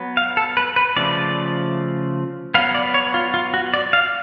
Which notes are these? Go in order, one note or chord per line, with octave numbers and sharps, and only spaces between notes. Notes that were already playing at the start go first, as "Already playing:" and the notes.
Already playing: F#3 B3
F5
A4
B4
B4
C#3 F3 A3 D5
F#3 B3 F5
D5
C#5
F4
F4
F#4
D5
F5